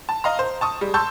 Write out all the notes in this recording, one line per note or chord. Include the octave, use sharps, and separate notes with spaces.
A5
D#5 F5 A#5
C5
A5 C#6 D#6
G3 G#3
A5 C6 C#6 E6 G6